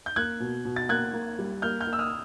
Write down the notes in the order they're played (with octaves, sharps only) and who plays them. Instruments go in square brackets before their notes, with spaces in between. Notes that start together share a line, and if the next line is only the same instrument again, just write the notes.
[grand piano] G6
[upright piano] A#3 [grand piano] F#6 G#6
[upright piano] B2
B2
[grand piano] A6
[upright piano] A#3 [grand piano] F#6 G#6
[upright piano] A#3
G3
[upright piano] A#3 [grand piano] F6 G6
[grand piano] F6 G6
[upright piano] A#3
[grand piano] E6
D#6 F6